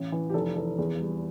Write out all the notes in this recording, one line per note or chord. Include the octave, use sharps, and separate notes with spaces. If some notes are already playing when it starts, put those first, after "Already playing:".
Already playing: A1
E3
G4
F1 A4
E3 A4
E2
G3